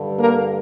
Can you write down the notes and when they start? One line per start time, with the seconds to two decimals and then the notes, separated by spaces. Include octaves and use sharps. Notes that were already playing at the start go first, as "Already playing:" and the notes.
Already playing: G2 D3
0.17 A#3 A#4